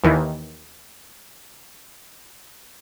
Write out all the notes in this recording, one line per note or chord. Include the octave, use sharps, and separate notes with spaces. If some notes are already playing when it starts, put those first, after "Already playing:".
D#2 D#3 E3